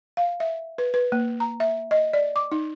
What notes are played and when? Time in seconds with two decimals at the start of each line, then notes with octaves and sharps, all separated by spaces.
0.17 F5
0.40 E5
0.78 B4
0.94 B4
1.12 A#3
1.40 A#5
1.60 E5
1.91 D#5
2.13 D5
2.36 D6
2.52 D#4